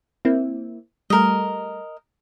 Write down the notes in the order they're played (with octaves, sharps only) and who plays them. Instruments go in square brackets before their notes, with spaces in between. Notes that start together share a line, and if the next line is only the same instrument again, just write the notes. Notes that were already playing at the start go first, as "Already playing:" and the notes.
[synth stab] A#3 C4 E4
[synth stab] G3 A3 [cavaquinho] A#4 D#5